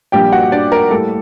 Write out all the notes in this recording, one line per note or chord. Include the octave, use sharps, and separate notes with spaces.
A#1 A#2 G3 D4 G4 G5
F#4 F#5
D4 D5
A#4
A2 G3 A#3 A4